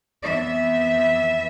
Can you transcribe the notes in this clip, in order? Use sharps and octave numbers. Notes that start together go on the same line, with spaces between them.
F2 E3 B3 E5